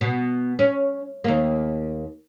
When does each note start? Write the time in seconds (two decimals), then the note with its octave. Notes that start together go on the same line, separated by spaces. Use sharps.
0.01 B2
0.59 C#4
1.24 D#2 A#3